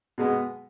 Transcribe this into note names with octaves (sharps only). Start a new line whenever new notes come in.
B2 G#3 B3